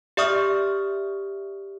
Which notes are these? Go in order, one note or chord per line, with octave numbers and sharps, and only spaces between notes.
G4 D5 E5 C#6 D#6 F6